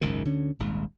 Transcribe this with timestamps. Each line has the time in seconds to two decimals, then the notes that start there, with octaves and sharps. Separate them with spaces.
0.01 F#1 C#2 G#2 D#3
0.24 D2 D3 C#4
0.59 D#1 G#1 G#2